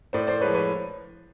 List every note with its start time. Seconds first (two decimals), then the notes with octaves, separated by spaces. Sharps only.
0.13 A2 C5 D5
0.27 C5 D5
0.41 F3 G#3 B4 C#5
0.54 B4 C#5